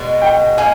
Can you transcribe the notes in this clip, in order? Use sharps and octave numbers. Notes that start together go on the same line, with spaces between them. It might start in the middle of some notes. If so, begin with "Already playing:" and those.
Already playing: B2 G#3 B3 D4
G5
A#3 D#4 G#4 G#5